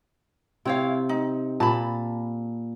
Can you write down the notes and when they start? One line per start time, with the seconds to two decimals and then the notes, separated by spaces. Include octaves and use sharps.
0.65 C3 C4 E4 C#5 F5
1.09 D#4
1.60 A#2 A5 B5